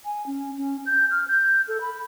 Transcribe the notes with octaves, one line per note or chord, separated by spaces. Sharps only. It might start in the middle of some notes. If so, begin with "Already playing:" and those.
G#5
C#4
C#4
G6
F6
G6
A4
B5